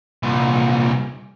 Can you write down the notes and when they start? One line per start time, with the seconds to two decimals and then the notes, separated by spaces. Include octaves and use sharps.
0.23 C2 A#2